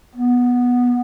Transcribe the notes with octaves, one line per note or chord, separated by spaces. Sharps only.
B3